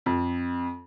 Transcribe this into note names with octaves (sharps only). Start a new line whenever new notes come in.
F2